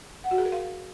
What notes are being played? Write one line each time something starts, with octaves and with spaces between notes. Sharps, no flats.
F#5
F#4
G#4
A#4
F5